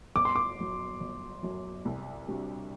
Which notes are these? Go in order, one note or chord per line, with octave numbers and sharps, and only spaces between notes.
G1 D6
C6
D6
F#2 F#3
G1
F#2 F#3
C2
C3 G3 D4 F#4